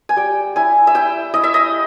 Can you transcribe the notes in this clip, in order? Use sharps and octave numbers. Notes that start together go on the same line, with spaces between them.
G#5
G3 G5
E4 G#5
E5
E4 G5
E4 D#5
E5
D#5